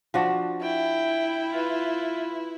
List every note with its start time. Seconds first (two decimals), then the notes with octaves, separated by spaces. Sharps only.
0.14 F3 D4 F#4
0.62 E4 G5
1.52 F4 B4